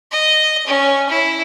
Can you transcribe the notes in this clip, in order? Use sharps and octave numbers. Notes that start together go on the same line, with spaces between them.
D#5
C#4
E4